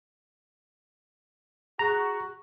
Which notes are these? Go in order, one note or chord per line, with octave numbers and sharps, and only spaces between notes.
F#4 G#4 A#5